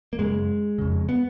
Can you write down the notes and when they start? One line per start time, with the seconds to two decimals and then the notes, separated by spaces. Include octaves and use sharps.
0.13 A#3
0.19 F#2 C#3 G#3
0.78 F2 C#3
1.09 B3